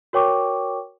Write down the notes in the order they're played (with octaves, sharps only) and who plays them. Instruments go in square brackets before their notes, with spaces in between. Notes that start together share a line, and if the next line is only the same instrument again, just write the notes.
[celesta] F#4 A#4 C#5 G5 C#6 D6